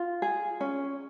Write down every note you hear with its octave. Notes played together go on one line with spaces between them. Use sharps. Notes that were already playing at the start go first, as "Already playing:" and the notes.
Already playing: F4
G#4
C#4